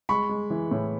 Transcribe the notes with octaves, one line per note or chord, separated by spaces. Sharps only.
G#3 B5 C#6
G#3
E3
A2